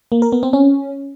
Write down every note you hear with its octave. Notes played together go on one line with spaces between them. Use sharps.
A#3
A#4
B3
C4
C#4